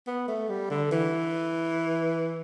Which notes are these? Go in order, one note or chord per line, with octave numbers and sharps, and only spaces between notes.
B3
A3
G3
D3
E3